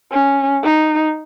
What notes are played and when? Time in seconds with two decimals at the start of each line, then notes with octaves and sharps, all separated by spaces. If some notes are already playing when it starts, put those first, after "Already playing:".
0.12 C#4
0.63 D#4